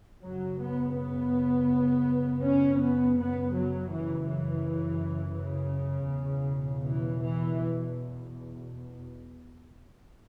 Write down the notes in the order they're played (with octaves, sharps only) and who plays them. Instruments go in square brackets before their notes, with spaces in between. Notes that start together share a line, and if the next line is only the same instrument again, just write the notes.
[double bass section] F#2 C#3 F#3
B3
B3
C#4
B3
F#2 C#3 B3
F#3
E3
E3
C#3
E2 B2
E3
E3